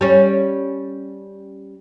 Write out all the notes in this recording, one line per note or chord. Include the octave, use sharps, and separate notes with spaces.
G3 C#4